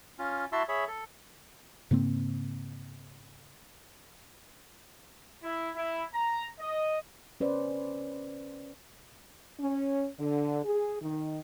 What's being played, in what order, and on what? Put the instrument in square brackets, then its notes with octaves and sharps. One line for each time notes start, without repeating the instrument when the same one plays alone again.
[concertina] C#4 F4
E4 F#4 E5 A5 C6 E6
G#4 C#5 E5 B5
A4
[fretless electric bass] G#2 C#3 A#3 C4
[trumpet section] E4
E4
A#5
D#5
[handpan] C#4 B4 C5 D5
[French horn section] C#4
D3
G#4
D#3